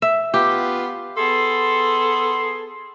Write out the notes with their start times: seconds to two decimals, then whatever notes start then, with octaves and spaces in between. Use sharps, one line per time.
0.02 E5
0.34 B3 F4 G4
1.17 B3 G#4 A4 C6